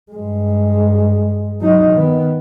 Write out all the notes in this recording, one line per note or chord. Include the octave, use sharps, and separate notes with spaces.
G2 G#3
F#3 D#4
D#3 B3